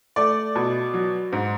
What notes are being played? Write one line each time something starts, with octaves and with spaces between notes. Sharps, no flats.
A3 D5 D6
B2
F#3
G#2